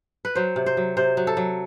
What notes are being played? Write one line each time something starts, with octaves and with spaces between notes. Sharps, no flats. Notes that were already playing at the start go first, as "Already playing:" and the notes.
B4
F#3 C5
C3
C5
F#3
C3 C5
F#3
A4
F#3